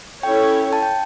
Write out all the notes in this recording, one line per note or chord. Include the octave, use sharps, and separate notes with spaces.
C#4 E4 A4 C#5 G5
A5
G5